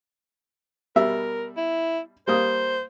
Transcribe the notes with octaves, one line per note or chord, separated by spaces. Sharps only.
B2 G3 A#4 E5
E4
G3 A#3 C5 D#6